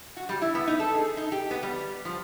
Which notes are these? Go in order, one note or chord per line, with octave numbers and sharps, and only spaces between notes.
F#4
G3
E4
B3
D#4
A4
G#4
D#4
G4
B3
G3
F3